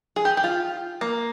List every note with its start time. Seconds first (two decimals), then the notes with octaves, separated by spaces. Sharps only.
0.16 G#4
0.25 G4
0.37 G4
0.44 F4
1.01 A#3